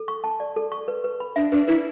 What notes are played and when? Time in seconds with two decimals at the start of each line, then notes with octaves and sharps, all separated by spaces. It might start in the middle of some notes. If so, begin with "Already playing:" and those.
Already playing: A4
0.08 C#6
0.24 A5
0.40 D5
0.56 A4
0.72 C#6
0.88 B4
1.04 B4
1.20 B5
1.36 D4 E5
1.52 D4 B4
1.68 E4 B4